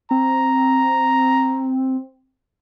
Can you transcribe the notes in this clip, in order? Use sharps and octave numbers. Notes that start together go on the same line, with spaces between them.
C4 A#5